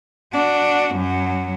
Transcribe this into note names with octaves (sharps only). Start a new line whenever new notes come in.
D4 F#4
F#2 F#3